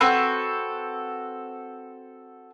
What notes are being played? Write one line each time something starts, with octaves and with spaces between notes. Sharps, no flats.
C4 F#4 A4 B4